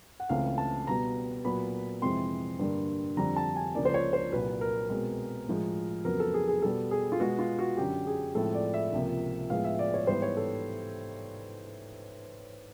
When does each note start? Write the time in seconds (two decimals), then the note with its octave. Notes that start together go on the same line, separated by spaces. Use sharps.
0.20 F#5
0.29 C#2 C#3 E3 A3 C4 F5
0.58 A5
0.87 B2 G3 B3 A#5
1.45 A#2 F#3 B3 B5
2.02 F2 C3 E3 G#3 C4 C6
2.59 G2 D3 G3 A#3
3.17 F2 D3 G3 C4 A#5
3.36 A5
3.56 G#5
3.75 C#2 C#3 F3 A#3 D5
3.85 C5
3.94 C#5
4.13 C5
4.32 C2 A#2 F#3 B4
4.61 A#4
4.90 B2 G#3 C4
5.48 A2 F3 G#3
6.04 F2 C#3 F#3 B3 A#4
6.20 A4
6.34 G#4
6.48 G#4
6.62 B2 G3 B3 A4
6.91 G#4
7.12 F4
7.19 B2 G#3 B3 F#4
7.39 F4
7.59 F#4
7.77 F#2 D3 F#3 G4
8.07 G#4
8.35 A2 F3 G#3 C4 A4
8.54 D5
8.74 E5
8.92 C#2 C3 F3 A#3
9.50 A2 F3 G#3 B3 F5
9.65 E5
9.79 D5
9.94 C#5
10.07 G#2 E3 G3 B3 C5
10.22 C#5
10.37 A4